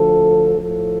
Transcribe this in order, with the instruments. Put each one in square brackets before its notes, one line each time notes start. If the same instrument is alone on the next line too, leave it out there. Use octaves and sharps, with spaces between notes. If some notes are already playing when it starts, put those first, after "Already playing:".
Already playing: [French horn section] D2 D3 F3 A4
A2 F3 A4